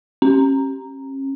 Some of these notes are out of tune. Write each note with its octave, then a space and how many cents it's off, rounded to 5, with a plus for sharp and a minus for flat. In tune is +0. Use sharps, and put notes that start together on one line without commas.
C#4 -35